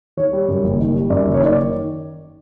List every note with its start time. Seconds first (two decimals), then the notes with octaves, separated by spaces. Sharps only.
0.17 D#3 C#5
0.33 G3
0.49 F#2
0.64 F#1
0.79 D#3
0.95 G3
1.10 F#2 D5
1.26 F#1
1.34 C#5
1.41 D#3 D5